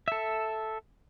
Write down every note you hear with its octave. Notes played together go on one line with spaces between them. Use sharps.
A4 E5